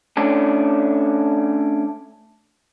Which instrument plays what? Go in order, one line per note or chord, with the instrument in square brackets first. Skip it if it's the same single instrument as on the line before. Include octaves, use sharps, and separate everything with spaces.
[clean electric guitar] A3 C#4 D4